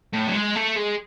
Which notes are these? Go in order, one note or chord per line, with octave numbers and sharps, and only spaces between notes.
A2
F#3
G#3
A3
G#3